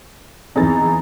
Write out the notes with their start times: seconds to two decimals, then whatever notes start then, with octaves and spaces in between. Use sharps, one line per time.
0.56 E2 E3 C4 D#4 G#4 A#5 A6